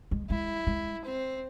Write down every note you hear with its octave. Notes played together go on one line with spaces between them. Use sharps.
G#3
G#3 E4
G#3
C4